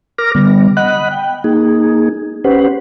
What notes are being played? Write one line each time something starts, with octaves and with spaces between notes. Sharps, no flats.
A#4 D6 F6 A#6
D3 G3 B3
D#5 F#5 B5 F#6
G5
A#3 D#4 G#4
C#4 G4 B4 C5 F#5